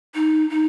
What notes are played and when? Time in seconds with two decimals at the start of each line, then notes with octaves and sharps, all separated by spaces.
0.14 D#4
0.50 D#4